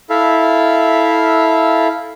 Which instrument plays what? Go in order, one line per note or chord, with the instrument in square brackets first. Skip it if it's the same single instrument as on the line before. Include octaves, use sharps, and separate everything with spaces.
[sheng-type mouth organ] E4 A4 E5 F5